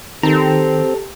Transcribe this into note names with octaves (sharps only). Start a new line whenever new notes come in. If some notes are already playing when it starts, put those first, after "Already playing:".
D#3 C4 G4 A4 A#5